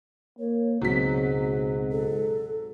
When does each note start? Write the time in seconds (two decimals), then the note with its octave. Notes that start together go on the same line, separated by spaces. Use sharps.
0.39 A#3 C#5
0.81 C#2 G#2 B2 F#3 C4 B6
1.91 A4